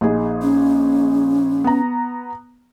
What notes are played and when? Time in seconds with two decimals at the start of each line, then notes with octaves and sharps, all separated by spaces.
0.01 A#1 D#4 G#4
0.42 C#4
1.64 B3 A#5